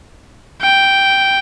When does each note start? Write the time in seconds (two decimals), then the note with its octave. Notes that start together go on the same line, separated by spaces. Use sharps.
0.62 G5